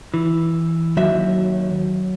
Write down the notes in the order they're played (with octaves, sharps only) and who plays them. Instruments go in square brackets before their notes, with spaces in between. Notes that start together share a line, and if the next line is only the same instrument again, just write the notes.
[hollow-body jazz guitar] E3
[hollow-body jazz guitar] D#2 F#4 E5 [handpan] F#3